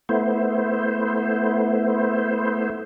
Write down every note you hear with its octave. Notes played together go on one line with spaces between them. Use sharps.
A3 B3 E4 C5